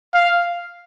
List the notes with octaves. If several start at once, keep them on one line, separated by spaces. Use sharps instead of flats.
F5